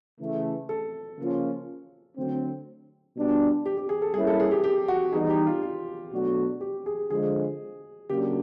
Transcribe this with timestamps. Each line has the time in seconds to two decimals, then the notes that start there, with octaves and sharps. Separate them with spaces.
0.19 C#3 E3 A3
0.69 A4
1.18 C#3 F3 A#3 C#4 F4
2.17 D3 F#3 A3 C4
3.15 B2 G3 B3 D4 F4
3.66 G4
3.77 G4
3.89 G#4
4.02 A4
4.14 G3 A#3 C#4 E4 G#4
4.27 A4
4.40 G#4
4.51 G4
4.64 G4
4.88 F#4
5.13 E3 G3 B3 D#4 G#4
5.30 G4
5.47 F4
5.62 F4
6.12 B2 F#3 A3 D4 F#4
6.61 G4
6.86 G#4
7.10 D3 F3 G#3 G#4
8.10 C#3 F#3 A#3 D4 G4